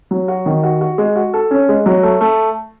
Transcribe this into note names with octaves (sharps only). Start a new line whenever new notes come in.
F#3
F#4
D#3
F#4
F#4
G#3
F#4
A4
C#4
G#3
F#3
A3
A3